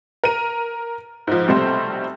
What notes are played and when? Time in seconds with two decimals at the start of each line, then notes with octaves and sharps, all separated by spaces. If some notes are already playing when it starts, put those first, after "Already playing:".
0.24 A#4 D#7
1.27 G#2 F3
1.48 B1 C3 G3 A3 C4 C5